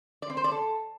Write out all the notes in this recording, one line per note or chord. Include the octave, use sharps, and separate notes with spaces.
D5
C4
C5
D5
A4